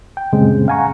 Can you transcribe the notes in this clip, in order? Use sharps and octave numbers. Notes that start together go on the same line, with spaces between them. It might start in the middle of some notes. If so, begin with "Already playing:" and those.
G5
F#2 A#2 C#3 G3 G#3 C4
F5 F#5 G#5 A#5 C#6